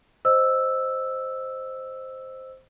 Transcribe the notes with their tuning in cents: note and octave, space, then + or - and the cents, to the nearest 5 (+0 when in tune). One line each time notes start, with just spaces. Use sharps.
C5 +0 D#5 -5 E6 +0